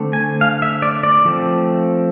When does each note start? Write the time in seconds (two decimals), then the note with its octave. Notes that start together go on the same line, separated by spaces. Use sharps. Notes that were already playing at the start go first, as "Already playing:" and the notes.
Already playing: D3 A3 C4
0.13 G#5
0.41 F5
0.62 E5
0.82 D5
1.03 D5
1.25 F3 A3 C4